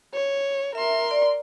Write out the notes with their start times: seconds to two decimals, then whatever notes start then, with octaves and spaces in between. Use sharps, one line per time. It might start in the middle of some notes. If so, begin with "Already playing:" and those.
0.14 C#5
0.75 A#4 E5 C6
1.11 D5